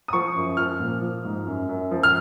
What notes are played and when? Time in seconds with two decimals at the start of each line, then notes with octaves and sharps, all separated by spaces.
0.08 D#6
0.13 F3 C#6
0.35 F#2
0.57 F3 F6
0.80 A#2
1.02 F3
1.25 G#2
1.47 F#2
1.69 F#2
1.91 F3
2.03 F6